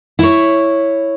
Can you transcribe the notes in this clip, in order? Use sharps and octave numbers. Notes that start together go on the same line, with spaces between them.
E4 C#5